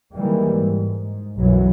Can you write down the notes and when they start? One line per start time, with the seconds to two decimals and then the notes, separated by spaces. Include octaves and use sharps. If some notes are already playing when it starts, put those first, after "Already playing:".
0.14 D#3 E3 G3 G#3 A#3
0.54 G#2
0.97 G#2
1.37 B1 F#2 E3 F#3